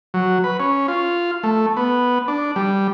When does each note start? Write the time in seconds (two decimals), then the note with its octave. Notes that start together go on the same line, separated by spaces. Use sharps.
0.14 F#3
0.44 B4
0.60 C#4
0.88 F4
1.43 A3
1.77 B3
2.28 D4
2.56 G3